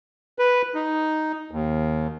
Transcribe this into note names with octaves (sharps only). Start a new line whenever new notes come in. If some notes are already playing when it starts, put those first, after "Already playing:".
B4
D#4
D#2